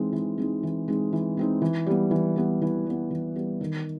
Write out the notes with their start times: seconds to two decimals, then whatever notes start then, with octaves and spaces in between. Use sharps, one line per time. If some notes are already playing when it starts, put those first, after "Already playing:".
Already playing: E3 G#3 C4 D#4
0.13 E3
0.38 G#3 C4 D#4
0.63 E3
0.88 G#3 C4 D#4
1.13 E3
1.37 G#3 C4 D#4
1.62 E3
1.86 G3 B3
2.11 E3
2.36 G3 B3
2.62 E3
2.86 G3 B3
3.11 E3
3.36 G3 B3
3.61 D#3